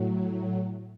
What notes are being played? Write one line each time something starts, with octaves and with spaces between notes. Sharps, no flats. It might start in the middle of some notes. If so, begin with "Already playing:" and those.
Already playing: A2 F#3